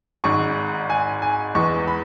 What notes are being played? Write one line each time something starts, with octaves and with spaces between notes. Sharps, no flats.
G#1 G#2 G#3 C#6
G#5
G#5
E2 E3 G#3 C#6
B5